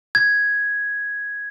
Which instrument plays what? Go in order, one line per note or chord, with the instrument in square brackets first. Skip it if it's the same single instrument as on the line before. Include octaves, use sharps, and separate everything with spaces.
[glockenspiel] G#6